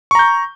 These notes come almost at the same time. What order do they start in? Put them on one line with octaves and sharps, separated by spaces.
C#6 A#5 G6